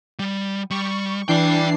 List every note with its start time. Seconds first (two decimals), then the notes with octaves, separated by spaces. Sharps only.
0.19 G3
0.71 G3 C#6
1.28 E3 D4 D5 G5 C7